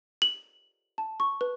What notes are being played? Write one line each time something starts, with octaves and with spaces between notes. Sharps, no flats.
F#7
A5
C#6
B4